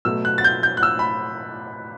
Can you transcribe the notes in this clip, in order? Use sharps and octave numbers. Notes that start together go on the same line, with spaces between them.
B2 F#3 A3 E6
F#6
A6
G6
G6
F#6
E6
B5